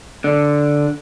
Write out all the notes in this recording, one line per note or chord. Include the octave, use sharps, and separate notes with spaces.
D3